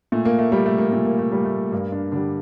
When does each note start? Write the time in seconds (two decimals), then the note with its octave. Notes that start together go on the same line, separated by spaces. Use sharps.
0.12 A#2 A3
0.25 A#3
0.39 A3
0.52 G3 A#3
0.66 A3
0.78 A#3
0.92 A#2 A3
1.05 A#3
1.19 A3
1.32 G3 A#3
1.45 A3
1.72 G2 A#3
1.92 D4
2.12 D3 G3 D4